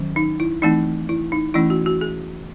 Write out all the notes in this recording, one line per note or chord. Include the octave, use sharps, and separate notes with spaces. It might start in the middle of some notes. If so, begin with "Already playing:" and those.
Already playing: D#3 F#3 C#4
D#4
E4
E3 A3 C4 D#4
E4
D#4
E3 A3 C#4 E4
F#4
F#4
G#4